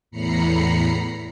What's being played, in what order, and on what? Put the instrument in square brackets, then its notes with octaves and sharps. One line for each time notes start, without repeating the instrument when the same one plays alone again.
[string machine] E2 A2 A#5 B5 C7 C#7